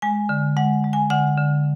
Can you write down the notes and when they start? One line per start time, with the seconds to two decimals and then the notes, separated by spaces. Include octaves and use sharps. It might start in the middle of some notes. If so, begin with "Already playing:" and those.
0.02 G#3 G#5
0.29 D3
0.57 G#3 F#5
0.84 G#3
0.93 G#5
1.10 D3 F#5
1.38 D3